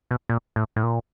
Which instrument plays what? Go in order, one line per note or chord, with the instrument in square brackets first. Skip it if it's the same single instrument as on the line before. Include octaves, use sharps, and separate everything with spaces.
[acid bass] B2
A#2
A2
A2
A#2